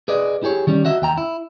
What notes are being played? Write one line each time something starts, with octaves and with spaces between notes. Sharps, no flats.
G#4 B4 D5 D#5
E4 G4 G#4 C#5
D#3 G3 C#4
F#4 D#5 E5
D#2 G5 A#5
E4